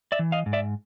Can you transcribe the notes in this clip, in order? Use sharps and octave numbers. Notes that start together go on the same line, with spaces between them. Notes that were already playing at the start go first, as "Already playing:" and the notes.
D5 E5
E3
D#5 F5
G#2
D5 E5